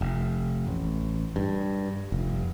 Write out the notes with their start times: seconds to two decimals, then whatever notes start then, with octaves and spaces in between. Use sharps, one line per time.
0.01 F1
0.67 A1
1.36 G2
2.12 F1